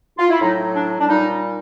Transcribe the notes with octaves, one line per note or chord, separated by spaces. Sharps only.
F4
E4
A2 F#3 D#4
D4
D4
A#2 G3 D#4